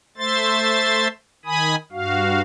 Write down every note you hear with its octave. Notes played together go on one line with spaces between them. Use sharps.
A3 C5 E5 C6 A6
D#3 G#5 B5 D#6
G2 F#4 F5